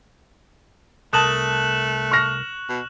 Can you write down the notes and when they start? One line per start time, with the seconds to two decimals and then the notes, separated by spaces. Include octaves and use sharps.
1.13 C2 A3 A#4 A5 D#6 F#6 E7 F#7
2.11 C#6 F6 A#6
2.69 B2